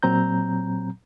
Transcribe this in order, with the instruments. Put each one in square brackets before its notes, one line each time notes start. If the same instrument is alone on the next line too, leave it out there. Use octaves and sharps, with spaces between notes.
[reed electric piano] A#2 F#3 C4 A#5 G6